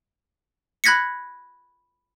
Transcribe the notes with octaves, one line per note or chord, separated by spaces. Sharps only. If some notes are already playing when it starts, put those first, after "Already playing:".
B5 F#6 G#6 A#6 B6 C#7